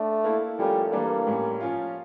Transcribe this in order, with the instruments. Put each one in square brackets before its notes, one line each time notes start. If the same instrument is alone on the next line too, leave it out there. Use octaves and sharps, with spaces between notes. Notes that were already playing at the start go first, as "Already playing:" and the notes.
Already playing: [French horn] A3 [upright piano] D4
[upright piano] A#3 E4 A4
[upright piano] F3 A3 C#4 F4 A#4 [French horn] G3
[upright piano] E3 G3 D4 A4 [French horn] A#3
[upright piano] A2 G3 C#4
F3 C#4 F4